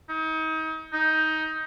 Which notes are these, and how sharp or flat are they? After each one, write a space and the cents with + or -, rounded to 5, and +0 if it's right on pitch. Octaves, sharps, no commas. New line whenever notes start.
D#4 +35
D#4 +15